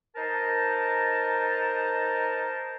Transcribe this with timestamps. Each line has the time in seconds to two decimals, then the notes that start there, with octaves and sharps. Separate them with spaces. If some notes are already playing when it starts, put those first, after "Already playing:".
0.16 D#4 A#4 C5 A5